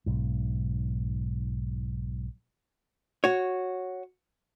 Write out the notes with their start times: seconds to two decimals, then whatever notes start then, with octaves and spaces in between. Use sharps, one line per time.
0.06 B1 G#2
3.24 F#4 C#5